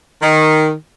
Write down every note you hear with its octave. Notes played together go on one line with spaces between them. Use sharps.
D#3